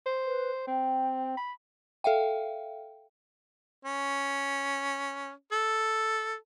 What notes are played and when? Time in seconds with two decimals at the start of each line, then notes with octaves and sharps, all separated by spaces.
0.06 C5
0.26 B4
0.68 C4 G5
1.37 B5
2.04 A4 E5 F5 G5
3.85 C#4
5.52 A4